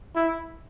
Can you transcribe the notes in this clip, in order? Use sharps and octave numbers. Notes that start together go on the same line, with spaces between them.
E4